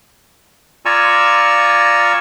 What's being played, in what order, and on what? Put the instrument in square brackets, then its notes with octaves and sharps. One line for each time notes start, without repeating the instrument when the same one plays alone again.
[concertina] F4 D5 G#5 A#5 C#6 E6